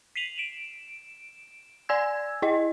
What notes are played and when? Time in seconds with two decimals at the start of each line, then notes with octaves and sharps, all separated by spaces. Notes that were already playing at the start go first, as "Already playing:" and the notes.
0.16 B6 C7 D#7 F7 F#7
0.38 D7 E7
1.89 D5 G#5 E6 G#6
2.42 E4 D#5